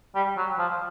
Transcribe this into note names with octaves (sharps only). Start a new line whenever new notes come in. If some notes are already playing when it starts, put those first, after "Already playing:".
G3
F#3
F3